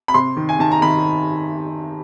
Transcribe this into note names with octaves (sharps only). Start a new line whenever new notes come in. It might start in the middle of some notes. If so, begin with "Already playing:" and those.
B5
C3 C6
D#3
G#5
D#3 A5
A#5
D#3 B5